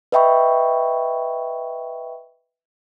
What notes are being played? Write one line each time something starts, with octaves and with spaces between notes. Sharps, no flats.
B4 D#5 E5 G5 B5 C#6